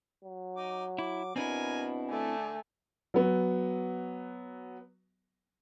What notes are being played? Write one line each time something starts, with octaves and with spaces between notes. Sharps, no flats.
F#3
D#4 D6
E4 D6
B2 C4 D4 E4 A#4 G#5
D3 A3 D5 G#5
F#3 B3